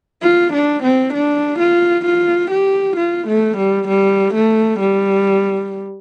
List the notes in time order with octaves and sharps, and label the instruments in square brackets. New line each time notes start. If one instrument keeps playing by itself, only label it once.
[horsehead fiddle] F4
D4
C4
D4
F4
F4
G4
F4
A3
G3
G3
A3
G3